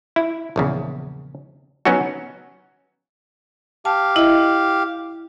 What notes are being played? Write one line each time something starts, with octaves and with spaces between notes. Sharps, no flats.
E4
A#1 E2 C#3
F#3 B3 C#4 D#4 F#4
G4 F5 A5
E4 D#5 E5